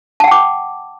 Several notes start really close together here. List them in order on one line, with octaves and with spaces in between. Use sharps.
A5 F#5 G5 D6